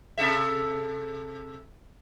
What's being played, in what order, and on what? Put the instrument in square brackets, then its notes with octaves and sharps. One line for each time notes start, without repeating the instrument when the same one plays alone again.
[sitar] C3 A4 E5